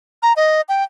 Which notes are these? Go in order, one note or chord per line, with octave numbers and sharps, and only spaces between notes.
A#5
D#5
G5